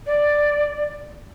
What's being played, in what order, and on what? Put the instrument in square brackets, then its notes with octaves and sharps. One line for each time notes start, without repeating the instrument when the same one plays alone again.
[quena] D5